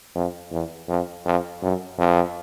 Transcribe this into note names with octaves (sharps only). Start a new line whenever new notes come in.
F2
E2
F2
F2
F#2
F2